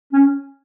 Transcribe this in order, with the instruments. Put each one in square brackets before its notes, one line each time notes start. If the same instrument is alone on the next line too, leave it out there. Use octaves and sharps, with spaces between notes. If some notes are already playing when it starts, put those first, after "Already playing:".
[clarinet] C#4